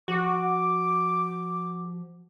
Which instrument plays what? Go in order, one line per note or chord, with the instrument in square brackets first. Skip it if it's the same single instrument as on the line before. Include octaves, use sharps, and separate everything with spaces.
[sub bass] F3 [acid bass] F#4 [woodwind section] D6